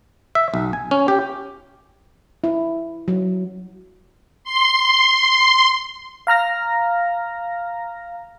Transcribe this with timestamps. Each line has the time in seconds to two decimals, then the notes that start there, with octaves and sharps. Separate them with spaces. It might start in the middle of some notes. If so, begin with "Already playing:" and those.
0.35 E5
0.54 B1
0.73 G#5
0.91 C#4
1.08 G4
2.44 E4
3.08 F#3
4.44 C6
6.27 F5 A#5 F6 A#6